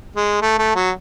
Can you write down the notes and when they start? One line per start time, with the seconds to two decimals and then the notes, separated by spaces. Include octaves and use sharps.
0.16 G#3
0.41 A3
0.58 A3
0.75 F#3